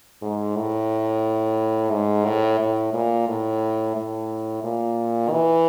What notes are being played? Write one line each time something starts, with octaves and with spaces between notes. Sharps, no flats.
G#2
A2
G#2
A2
A2
A#2
A2
A2
A#2
E3